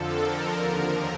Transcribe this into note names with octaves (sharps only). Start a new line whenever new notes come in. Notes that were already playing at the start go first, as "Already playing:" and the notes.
Already playing: F2 D3 F3 A4
A#4
D#2 D3 F3